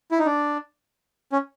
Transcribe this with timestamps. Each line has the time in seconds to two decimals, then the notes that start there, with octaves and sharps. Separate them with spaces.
0.11 E4
0.19 D#4
0.25 D4
1.32 C#4